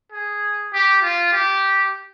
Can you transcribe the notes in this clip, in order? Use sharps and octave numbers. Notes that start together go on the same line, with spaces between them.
G#4
G4
F4
G4